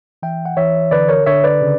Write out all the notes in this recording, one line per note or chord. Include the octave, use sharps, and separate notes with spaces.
E3 E5 G5
F#5
E3 C#5 E5
D3 B4 D5
A#4 C#5
D3 C#5 E5
B4 D5
C#3